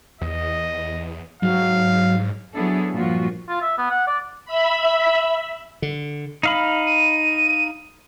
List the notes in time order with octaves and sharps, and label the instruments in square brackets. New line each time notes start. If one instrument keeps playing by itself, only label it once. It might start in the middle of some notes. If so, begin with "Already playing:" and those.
[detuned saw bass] E2 [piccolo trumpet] D#5
[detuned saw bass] G#2 [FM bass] F#3 [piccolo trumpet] F5
[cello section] F#3 B3 D4 E4 G#4 A4
G2 A#2 F3 F4 F#4
[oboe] F4
E5
B3
F#5
D5
[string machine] E5 B5
[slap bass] D3
[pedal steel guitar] D#4 F5 B5
[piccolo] D#7